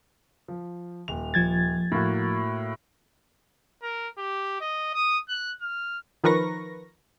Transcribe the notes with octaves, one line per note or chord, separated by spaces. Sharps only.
F3
D#1 F7
F3 G#6 A6
A2 A#3 F#4
A#4
G4
D#5
D#6
F#6
F6
D#3 F3 A#4 B4 C#6 A#6